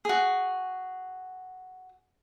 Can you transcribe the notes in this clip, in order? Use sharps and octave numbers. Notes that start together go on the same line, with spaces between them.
F#4 G#4